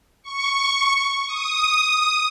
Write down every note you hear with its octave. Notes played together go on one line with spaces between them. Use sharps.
C#6
D#6